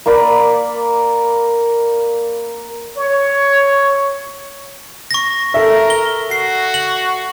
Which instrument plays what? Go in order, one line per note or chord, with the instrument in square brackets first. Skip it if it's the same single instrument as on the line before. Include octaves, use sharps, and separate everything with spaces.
[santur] A#3 A#4 D5 B5
[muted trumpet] C#5
[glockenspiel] C#6 A#6
[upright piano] A4 E5 [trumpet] A#4
[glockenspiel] G7
[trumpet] F#4 [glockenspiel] C7
[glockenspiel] F#7